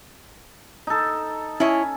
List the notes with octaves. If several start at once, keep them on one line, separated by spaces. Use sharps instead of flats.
D#4 A4
C#4 E4 C#5 D#5